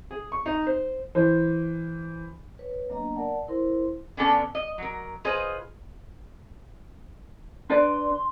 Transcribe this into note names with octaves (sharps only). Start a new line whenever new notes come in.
G#4
C#6
D#4
C5
E3 C5
B4 C#5
F#3 A#3 B3 D4 D#5 A#5
A#4 D5 F#5 A5
E4 A#4 C5 C6
D3 B3 C#4 D4 A4
D#5
F#3 A#4
F4 G#4 B4 C5 D#5
D4 B4 D5 C6